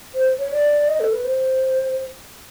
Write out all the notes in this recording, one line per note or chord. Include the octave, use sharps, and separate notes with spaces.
C5
C#5
D5
D#5
A4
B4
C5